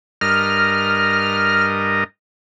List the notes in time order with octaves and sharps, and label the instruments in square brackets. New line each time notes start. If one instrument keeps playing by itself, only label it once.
[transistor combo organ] G2 A#4 D#5 [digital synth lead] F6